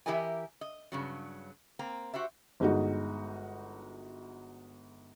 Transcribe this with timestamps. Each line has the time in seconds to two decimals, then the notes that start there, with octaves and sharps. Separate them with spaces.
0.06 E3 E4 G4 A#4 D#5 G#5
0.61 D#5
0.92 G2 C#3 F#3
1.79 A#3 C4 A#5
2.14 F#4 G4 C5 E5
2.60 G1 G#3 D#4 F#4